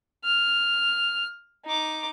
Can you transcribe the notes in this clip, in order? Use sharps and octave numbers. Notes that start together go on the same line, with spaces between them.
F6
D#4 D6